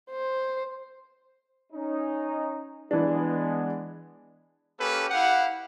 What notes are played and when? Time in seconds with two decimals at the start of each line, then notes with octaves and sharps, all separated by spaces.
0.11 C5
1.73 C#4 D#4
2.91 E3 G#3 B3 D4
4.79 A#3 C#4 G4 A4 B4
5.10 E4 G4 F5 F#5